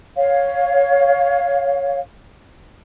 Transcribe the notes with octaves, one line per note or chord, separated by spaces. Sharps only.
C#5 F5